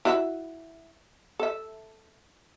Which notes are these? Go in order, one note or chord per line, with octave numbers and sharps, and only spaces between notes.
E4 F#4 E5
A4 E5